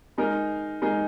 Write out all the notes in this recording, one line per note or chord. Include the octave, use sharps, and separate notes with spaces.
G#3 D#4 A#4
G#3 D#4 A#4